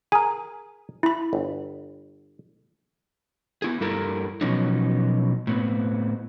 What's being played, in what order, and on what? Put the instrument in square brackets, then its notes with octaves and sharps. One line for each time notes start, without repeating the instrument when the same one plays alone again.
[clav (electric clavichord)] G#4 A#4 [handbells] G#5
[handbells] E4 B5
[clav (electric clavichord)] G1
[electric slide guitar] B3 E4 G#4
G2 G3 E4 A4 A#4 A#5
B2 F3 F#3 B3 C#4 D#4
A2 B3 C4